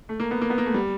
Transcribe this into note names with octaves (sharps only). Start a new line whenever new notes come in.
A3
A#3
B3
A#3
B3
A#3
A3
G3